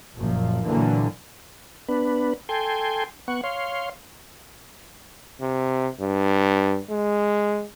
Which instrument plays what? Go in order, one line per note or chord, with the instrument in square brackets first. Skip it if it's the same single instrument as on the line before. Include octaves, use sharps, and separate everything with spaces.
[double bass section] F#1 F#2 A#2 F3
A#2 D3 E3 F#3 A#3
[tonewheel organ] B3 D4 B4
A4 G5 G#5 C6
B3 F#5 C#6
C#5 F5 C6
[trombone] C3
G2
G#3